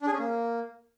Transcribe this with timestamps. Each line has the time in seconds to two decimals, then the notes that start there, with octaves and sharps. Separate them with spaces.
0.01 D4
0.07 G#4
0.13 C#4
0.19 A#3